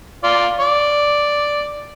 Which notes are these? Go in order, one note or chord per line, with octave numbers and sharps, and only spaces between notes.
F4 D5
D5